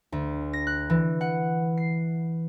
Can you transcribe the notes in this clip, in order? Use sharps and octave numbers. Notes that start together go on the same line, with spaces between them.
D2
A#6
F#6
E3
F#5
C7